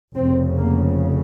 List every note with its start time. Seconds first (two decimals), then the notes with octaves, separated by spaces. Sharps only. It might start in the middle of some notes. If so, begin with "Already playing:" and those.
0.16 F1 F2 C#3 C4
0.57 A#3